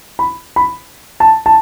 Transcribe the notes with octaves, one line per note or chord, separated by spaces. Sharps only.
B5
B5
A5
A5